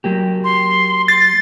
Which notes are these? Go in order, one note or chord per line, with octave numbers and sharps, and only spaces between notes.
F#3 A#3 G4
C6
A6 C7